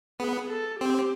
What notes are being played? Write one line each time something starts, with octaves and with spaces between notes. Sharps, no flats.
B3 G#4
A4
C4 G4